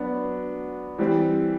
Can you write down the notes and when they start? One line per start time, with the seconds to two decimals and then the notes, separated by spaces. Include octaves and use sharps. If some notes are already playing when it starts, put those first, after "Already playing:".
Already playing: F#3 B3 D4 F#4
0.98 E3 G3 C4